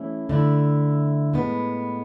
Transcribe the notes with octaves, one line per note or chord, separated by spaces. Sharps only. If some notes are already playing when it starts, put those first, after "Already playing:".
Already playing: E3 A3 C#4 E4
D3 A3 E4
A2 G#3 B3